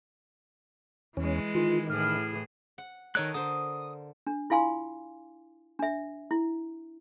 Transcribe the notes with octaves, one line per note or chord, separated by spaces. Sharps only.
E2 E3 G#3 C#4
D#3 F4
A2 E3 G#4 F6
F#5
D#3 A4 A#4 C#5 D#5 F#6
D3 C5 D#6
D4
E4 F4 F5 G#5 C6
D4 E5
E4